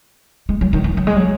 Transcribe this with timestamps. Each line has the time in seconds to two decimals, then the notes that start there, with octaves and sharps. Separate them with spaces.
0.49 G#3
0.61 F#3
0.73 D#3
0.84 E3
0.97 F#3
1.07 G#3
1.16 F#3